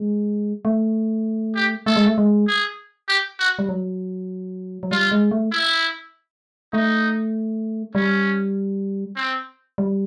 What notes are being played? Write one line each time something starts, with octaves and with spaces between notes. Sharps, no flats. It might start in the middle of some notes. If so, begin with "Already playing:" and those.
Already playing: G#3
A3
G4
A3 A4
G#3
A3
G#3
G#4
G4
F#4
G3
F#3
F#3
G3 F4
G#3
A3
E4
A3 D#4
G3 C#4
C4
G3